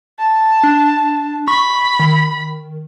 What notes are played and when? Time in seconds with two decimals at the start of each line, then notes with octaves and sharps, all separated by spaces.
0.19 A5
0.63 D4
1.48 B5 C#6
2.00 D#3